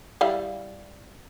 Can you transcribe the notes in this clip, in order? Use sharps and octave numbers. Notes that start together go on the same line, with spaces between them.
G3 E4 F5